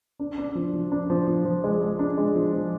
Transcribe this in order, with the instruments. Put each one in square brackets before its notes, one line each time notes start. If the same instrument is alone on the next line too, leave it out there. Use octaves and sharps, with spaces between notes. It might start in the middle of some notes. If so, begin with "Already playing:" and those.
[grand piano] D4
D4
F3
F3
D4
F3
F3
F3
G#3
G#3
D4
G#3
F3
F3